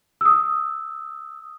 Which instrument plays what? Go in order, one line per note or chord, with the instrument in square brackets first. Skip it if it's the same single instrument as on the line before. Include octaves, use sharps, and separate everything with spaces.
[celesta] D#6 E6